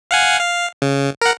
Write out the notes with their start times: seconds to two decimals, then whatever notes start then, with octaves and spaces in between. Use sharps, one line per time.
0.11 F5 F#5 G#5
0.40 F5
0.82 C#3
1.22 A#4 F#5